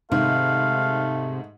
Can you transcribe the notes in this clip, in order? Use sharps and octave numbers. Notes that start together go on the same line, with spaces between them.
G#2 C3 D#3 A3 F5